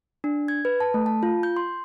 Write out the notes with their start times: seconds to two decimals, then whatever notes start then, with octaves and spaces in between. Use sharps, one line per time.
0.24 D4
0.48 G#6
0.65 B4
0.80 A5
0.94 A3
1.06 A5
1.23 F4
1.43 G6
1.57 C6